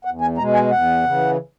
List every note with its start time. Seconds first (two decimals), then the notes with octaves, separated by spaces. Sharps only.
0.05 E2 F#5
0.21 G#5
0.38 B2 G#3 A#5
0.54 G#5
0.71 E2 F#5
1.04 C#3 E3